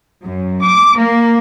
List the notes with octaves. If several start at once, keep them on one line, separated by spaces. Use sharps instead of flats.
F#2
D6
A#3